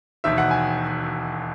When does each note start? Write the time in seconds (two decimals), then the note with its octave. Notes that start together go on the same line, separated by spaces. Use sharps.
0.24 E1 D#2 D#3 E5
0.38 F#5
0.51 G#5